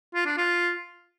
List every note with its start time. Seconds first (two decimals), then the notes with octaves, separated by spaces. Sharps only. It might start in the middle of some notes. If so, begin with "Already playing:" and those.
0.14 F4
0.26 D4
0.37 F4